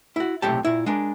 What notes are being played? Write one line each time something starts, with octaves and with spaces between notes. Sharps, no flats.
E4 F#4
B1 A2 C3 G4 A5
A#2 E4
G#3 D4 A#4